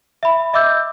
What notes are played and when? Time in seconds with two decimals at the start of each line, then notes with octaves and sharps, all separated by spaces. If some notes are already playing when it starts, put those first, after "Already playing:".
0.23 E5 B5
0.53 D#5 E5 D6 E6 G6